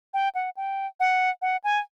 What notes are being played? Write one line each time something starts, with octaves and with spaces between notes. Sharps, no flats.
G5
F#5
G5
F#5
F#5
G#5